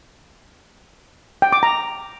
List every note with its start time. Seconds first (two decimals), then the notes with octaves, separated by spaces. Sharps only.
1.42 G5
1.53 D6
1.63 A#5